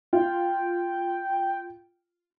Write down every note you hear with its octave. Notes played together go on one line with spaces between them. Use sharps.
F4 G5